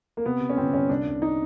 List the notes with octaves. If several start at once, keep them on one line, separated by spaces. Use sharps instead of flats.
A#3
C3 B3
C3
C#4
G1 C4
G1 C#4
C2 D4
C2
D#4